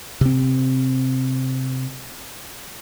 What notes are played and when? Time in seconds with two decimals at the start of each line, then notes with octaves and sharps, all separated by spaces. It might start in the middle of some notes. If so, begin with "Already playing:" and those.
0.21 C3 C4